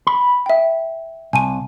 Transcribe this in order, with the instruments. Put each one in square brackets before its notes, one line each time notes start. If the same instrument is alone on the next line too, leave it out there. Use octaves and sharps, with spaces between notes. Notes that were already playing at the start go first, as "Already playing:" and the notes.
[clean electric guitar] B5
[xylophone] E5 G5
[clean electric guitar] C2 [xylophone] G#5 A5 D#7